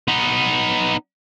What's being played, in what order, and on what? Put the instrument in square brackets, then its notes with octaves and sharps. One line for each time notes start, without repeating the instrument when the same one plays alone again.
[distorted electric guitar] B3 D#4